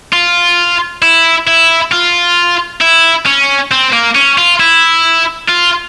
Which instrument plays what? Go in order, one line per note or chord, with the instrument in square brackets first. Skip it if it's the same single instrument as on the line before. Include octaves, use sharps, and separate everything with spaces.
[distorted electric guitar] F4
E4
E4
F4
E4
C#4
C4
A#3
C#4
F4
E4
F4